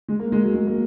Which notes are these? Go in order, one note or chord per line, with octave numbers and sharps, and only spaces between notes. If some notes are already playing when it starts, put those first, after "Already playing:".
G#3
A#3
G#3
F#3
G#3
A#3